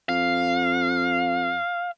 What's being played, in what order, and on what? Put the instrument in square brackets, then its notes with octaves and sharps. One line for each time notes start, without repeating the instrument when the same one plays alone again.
[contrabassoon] F2 [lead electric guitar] F5